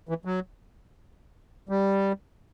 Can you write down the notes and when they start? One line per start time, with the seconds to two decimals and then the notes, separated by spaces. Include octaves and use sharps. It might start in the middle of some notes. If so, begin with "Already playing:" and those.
0.09 E3
0.25 F#3
1.69 G3